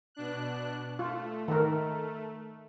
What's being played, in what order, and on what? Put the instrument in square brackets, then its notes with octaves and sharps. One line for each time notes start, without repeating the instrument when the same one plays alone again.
[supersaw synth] B2 D4 F#6
[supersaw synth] A3 [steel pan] F4
[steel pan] D#3 A#4